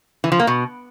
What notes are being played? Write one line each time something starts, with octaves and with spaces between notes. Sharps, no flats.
E3
F3
A#3
B2